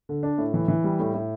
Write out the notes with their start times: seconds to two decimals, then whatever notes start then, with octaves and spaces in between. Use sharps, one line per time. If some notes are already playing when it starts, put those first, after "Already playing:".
0.09 D3
0.23 D4
0.38 A2
0.54 E3
0.68 E3
0.84 G3
1.00 A2
1.14 A2